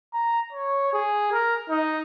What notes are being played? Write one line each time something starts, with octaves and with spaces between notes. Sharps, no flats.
A#5
C#5
G#4
A#4
D#4